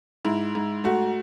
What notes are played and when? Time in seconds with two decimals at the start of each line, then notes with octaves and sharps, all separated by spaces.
0.25 G#2 E4
0.55 G#2
0.84 A3 F#4